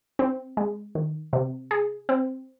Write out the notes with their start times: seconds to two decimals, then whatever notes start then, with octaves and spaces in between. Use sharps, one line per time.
0.19 C4
0.57 G#3
0.95 D#3
1.33 C3
1.71 G#4
2.09 C4